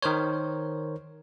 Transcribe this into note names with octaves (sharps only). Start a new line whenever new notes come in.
D#3 A#4 C5 C#5